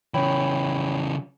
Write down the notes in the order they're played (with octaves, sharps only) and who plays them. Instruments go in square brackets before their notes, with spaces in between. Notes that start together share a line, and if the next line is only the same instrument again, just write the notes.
[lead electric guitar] C#3 E3 [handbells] C#5 G5 B5